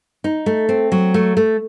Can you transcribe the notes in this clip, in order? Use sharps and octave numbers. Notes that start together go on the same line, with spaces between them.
D#4
A3
C4
F#3
A3
A3